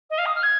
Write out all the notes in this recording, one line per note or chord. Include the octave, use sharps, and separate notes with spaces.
D#5
F5
D#6
F6
G#6